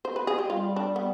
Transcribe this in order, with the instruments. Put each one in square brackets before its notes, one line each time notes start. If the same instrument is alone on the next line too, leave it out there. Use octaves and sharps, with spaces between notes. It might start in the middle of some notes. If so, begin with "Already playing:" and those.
[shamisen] C5
B4
G#4
G4
[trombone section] G3 [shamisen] F4
[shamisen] D4
B3